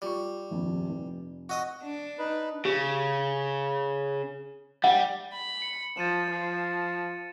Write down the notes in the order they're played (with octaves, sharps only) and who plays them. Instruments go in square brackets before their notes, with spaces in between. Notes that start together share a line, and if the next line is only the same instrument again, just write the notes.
[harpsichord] G3 [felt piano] F4 C#6
[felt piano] D#1 A#1 F2
F1
[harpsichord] F#4 D#5 D#6
[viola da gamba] D4
[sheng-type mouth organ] D#4 B4
[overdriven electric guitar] C#3 [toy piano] G4
[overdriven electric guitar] G3 [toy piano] F#5
[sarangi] B5
[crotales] C#7
[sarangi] F3 [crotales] A6 D#7 E7
[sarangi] F3